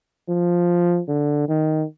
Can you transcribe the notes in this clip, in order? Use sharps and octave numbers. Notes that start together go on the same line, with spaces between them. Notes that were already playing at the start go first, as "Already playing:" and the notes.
F3
D3
D#3